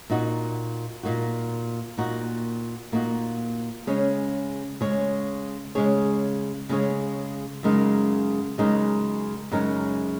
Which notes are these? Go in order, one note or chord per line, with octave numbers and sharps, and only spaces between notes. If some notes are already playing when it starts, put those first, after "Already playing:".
A#2 A#3 D#4 F#4
A#2 A#3 D#4 F#4
A#2 A#3 D#4 F#4
A#2 A#3 D#4 F#4
C#3 G#3 C#4 G#4 C#5
C#3 G#3 C#4 G#4 C#5
C#3 G#3 C#4 G#4 C#5
C#3 G#3 C#4 G#4 C#5
F#2 C#3 G#3 D#4 A#4
F#2 C#3 G#3 D#4 A#4
F#2 C#3 G#3 D#4 A#4